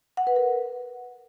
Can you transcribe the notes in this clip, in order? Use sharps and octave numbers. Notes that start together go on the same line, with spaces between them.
F#5
B4
A#4